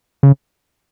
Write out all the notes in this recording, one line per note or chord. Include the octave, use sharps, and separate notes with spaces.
C#3